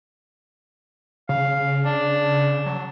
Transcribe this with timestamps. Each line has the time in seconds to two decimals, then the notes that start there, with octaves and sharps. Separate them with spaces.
1.29 C#3 F5
1.85 D4
2.66 F#3